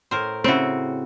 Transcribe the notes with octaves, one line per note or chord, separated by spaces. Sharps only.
A2 A#4 C5
C#3 C4 E4 F#4